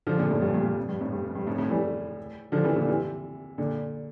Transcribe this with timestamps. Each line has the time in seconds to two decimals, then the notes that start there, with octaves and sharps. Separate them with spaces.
0.07 D3 F3
0.18 A#2 D3
0.31 A2 C3
0.41 G2 A#2
0.54 G2 A#2
0.65 G2
0.77 F2
0.88 G2
1.00 F2 A2
1.12 G2
1.24 F2
1.35 G2
1.47 F2 A2
1.58 F2 A2
1.70 E3 G3
2.52 D3 F3
2.64 C3 E3
2.76 A#2 D3
2.87 C3 E3
3.58 A#2 D3